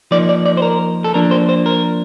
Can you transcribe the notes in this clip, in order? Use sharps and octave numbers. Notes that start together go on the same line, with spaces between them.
F3 A#3 D#4 D5
D5
D5
C5
A#4
A4
F3 A#3 D4 A#4
C5
C5
A#4